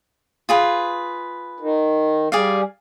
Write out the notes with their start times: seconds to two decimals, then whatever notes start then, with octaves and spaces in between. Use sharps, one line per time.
0.49 F4 G#4 B4
1.60 D#3
2.32 G3 G#4 D5 F5